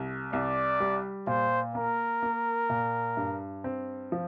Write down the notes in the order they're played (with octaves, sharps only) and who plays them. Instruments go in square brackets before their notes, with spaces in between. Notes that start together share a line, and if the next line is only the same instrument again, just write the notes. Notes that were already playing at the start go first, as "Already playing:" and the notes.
Already playing: [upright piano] C2
[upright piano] C2 [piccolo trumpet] D5
[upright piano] G3
[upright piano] A#2 [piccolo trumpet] C5
[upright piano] A#3 [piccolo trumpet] A#4
[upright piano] A#3
A#2
G2
C4
F3